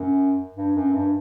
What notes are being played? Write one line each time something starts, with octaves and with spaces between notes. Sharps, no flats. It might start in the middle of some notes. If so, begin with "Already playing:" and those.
Already playing: F#2
G2
F#2
G2